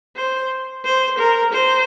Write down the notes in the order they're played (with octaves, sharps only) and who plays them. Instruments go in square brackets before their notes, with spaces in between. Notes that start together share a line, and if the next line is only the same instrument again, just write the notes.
[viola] C5
C5
A#4
C5